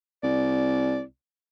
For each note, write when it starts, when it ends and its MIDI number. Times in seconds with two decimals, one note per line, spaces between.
0.23 1.01 36
0.23 1.01 74